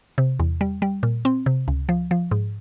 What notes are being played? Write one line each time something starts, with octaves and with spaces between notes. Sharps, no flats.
C3
E2
G3
G3
A#2
C4
C3
C#2
F3
F3
G#2